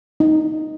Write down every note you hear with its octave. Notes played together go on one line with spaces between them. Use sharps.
D#4